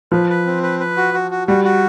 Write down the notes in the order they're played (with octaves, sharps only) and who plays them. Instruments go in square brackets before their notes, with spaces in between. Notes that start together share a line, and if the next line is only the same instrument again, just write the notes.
[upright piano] F3 [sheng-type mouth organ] B4
[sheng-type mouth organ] B4
C4
B4
B4
F#4
F#4
F#4
[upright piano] G3 [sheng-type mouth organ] F#4
[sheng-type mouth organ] F#4